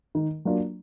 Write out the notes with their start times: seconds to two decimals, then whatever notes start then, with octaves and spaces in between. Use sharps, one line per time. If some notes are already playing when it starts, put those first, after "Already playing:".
0.15 D#3
0.45 F#3 A#3 D4 F4